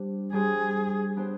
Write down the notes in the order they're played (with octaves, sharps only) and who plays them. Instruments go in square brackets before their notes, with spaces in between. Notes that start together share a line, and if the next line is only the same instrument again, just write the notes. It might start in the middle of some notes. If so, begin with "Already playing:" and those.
Already playing: [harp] G3 D4 G4 C5
[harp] G3 D4 G4 C5 [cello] G#4
[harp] B3 D4 G4 C5